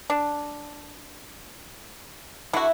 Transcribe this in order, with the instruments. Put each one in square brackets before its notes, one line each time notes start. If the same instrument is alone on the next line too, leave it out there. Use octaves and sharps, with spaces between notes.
[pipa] D4
[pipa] D3 F#4 [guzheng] E4